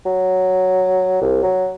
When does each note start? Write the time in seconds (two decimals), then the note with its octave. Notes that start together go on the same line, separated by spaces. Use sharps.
0.06 F#3
1.21 C2
1.43 F#3